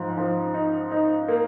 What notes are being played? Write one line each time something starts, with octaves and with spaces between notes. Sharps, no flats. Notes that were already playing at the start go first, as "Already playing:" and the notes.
Already playing: G#2 F3
F3
D#4
D#4
A#3